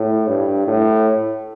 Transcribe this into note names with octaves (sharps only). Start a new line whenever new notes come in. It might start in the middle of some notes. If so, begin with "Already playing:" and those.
Already playing: A2
G2
A2